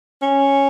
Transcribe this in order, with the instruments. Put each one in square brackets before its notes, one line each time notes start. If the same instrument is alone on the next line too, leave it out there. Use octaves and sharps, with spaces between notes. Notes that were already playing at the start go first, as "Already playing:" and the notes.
[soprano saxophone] C#4